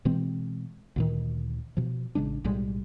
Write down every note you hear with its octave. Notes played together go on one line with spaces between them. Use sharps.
B2 E3 G#3 C4
D2 A#2 D#3
B2 F3
A1 C#3 G#3 D4
B1 A2 G3 G#3